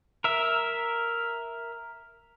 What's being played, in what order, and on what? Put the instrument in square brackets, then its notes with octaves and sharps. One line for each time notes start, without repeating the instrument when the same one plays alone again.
[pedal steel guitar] A#4 E5